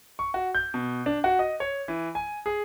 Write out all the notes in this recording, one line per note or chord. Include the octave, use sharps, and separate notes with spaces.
C#6
F#4
G6
B2
D4
F#4
D#5
C#5
E3
G#5
G#4